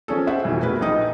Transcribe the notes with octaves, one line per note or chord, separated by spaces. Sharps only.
F3 C#4 G#4 A4
C5 E5 F#5
F2 B2 E3
A3 G#4 A#4 B4
A#1 D#4 D#5 D#6